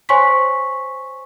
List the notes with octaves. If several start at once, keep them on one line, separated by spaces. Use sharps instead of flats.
C5 C#5 G#5 C6 C#6 B6